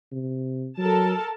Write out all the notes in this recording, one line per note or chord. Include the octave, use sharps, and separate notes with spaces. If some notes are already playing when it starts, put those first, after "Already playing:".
C3
F#3 A4 A#4 A5